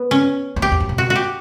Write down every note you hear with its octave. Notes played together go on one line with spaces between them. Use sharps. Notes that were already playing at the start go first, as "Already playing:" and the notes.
Already playing: B3
C#4
F2
E2 G4
F2
F#2
B2
F#4
F#4
G4